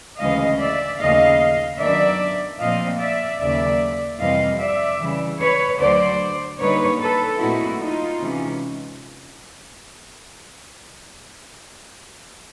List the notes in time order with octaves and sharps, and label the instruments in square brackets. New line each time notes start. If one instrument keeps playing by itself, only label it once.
[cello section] D2 C#3 E3 G#3 C#4 D#5 F5
D5 E5
D#2 C#3 F3 A3 D#5 F5
F#2 D#3 F#3 B3 D4 D5 E5
A#2 F3 A3 C4 D#5 F5
D5 E5
D#2 C#3 F#3 A#3 D5 E5
F2 C3 E3 G3 C4 D#5 F5
D5 E5
C#3 E3 G3
B4 C#5
D2 D3 F#3 C5 D5
D3 G3 A#3 D#4 B4 C#5
A4 B4
A#2 F#3 A3 C4 D#4 E4 F#4
D#4 F4
C3 E3 G#3 C#4